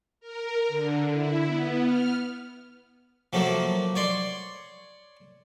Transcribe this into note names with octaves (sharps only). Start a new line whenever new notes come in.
A#4
D3
E4
B3
F6
F3 F#3 A3 A#3
C#5 D5 C6